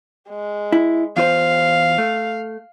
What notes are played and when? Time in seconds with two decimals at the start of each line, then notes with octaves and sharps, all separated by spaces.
0.29 G#3
0.72 E4
1.17 E2 F4 C5 F5
1.98 A3